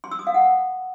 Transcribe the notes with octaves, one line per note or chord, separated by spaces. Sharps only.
C6
E6
D#6
F5
F#5